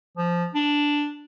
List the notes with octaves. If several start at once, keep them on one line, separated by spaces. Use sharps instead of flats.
F3
D4